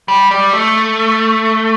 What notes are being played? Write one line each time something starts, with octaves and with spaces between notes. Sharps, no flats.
G3
G3
A3